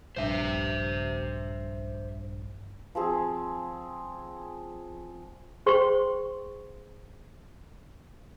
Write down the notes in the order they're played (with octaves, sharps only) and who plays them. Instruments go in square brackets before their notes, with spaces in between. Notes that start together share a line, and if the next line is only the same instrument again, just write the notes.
[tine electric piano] A#1 G2 [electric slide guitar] C5 E5
[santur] F3 C4 G#4
[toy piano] G#4 C5 G5 C6 C#6